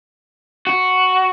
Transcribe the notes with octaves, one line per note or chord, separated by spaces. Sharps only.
F#4